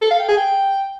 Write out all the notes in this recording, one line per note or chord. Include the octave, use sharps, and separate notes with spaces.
A4
F5
G5
G#4
G5